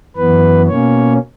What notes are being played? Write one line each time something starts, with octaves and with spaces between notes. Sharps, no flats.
F#2 E3 B3 B4
B2 A#3 C#4 C#5